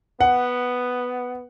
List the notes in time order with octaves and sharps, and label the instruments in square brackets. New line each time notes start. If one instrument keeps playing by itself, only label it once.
[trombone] B3 [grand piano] F#5